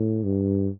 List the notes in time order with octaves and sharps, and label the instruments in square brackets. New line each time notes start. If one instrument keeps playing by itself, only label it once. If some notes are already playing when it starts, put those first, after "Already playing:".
Already playing: [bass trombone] A2
G2